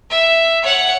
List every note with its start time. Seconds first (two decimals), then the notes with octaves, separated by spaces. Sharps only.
0.10 E5
0.62 C#5 F#5